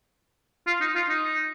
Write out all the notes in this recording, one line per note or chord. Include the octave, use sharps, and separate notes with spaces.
F4
D#4
F4
D#4